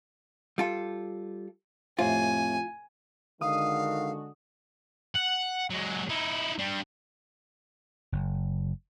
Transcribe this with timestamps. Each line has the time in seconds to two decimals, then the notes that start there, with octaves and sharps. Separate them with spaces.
0.58 G3 F4 A4
1.99 F2 A2 C3 F4 G#5
3.41 D3 D#3 G#3 F#4 F5 D#6
5.15 F#5
5.70 F#3 G#3
6.09 D#4 E4
6.58 G3 D4
8.12 F#1